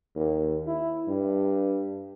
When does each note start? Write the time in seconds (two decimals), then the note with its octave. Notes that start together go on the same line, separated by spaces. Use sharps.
0.16 D#2
0.67 E4
1.08 G2